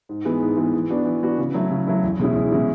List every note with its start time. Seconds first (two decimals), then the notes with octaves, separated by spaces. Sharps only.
0.09 G#2
0.25 E3 G#3 B3
0.42 G#2
0.57 E3 G#3 B3
0.73 E3
0.90 B3 D4 F#4
1.05 E3
1.23 B3 D4 F#4
1.38 C#3
1.54 F#3 A3 E4
1.71 C#3
1.88 F#3 A3 E4
2.03 E2
2.19 B2 G#3 C#4 E4
2.35 E2
2.52 B2 G#3 C#4 E4